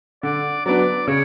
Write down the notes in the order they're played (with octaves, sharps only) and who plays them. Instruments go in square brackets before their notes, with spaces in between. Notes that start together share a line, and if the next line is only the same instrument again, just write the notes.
[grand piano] D3 [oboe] D5
[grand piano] F#3 B3 D4 [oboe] D5
[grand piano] C#3 [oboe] C#5